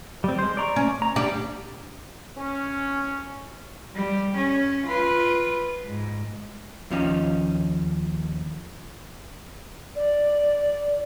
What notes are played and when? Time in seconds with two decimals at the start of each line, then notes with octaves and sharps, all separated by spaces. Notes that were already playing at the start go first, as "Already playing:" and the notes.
0.24 G3 C4
0.39 G#3 C5
0.57 D5 A#5 C#6
0.76 C#4
1.02 A#5
1.16 G3 D4 G4
2.37 C#4
3.96 G3
4.37 C#4
4.87 F4 B4
5.86 G#2
6.90 D#2 F3 C#4 D#4
9.96 D5